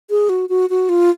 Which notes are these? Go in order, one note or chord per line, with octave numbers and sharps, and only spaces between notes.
G#4
F#4
F#4
F#4
F4